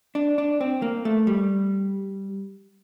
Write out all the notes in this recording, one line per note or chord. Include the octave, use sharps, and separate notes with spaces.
D4
D4
C4
A#3
A3
G3